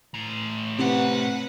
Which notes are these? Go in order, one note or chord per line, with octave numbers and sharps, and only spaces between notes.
A2 A#5
C3 B4 F#5